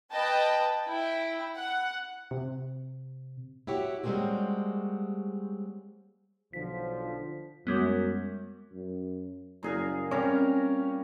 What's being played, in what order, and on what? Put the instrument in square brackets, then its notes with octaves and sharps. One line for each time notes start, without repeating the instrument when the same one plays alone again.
[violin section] B4 D#5 G5 A5
E4 G5
F#5
[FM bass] C3
[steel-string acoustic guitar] E4 F#4 G4 C#5
G3 G#3 A#3 C4 C#4 F#4
[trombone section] B1 D3 F3 [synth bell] B6
[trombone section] F#2 [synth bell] G3 G#3 B3
[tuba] F#2
[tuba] F#1 [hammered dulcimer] A#2 G#4 A#4
[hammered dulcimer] G3 A#4 A#5 [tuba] C4 [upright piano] C#4